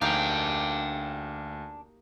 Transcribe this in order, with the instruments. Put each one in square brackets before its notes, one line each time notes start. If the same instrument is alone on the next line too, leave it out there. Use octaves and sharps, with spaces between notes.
[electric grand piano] D2 [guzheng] A#3 D#4 G4 [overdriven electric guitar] D4 [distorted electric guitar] F5 G5